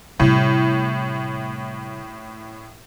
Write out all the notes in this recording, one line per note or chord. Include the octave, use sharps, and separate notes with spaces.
A2 C3 G3